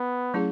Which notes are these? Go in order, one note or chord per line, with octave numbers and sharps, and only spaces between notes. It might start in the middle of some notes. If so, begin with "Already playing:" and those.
Already playing: B3
F#3 A3 C#4 E4 G#4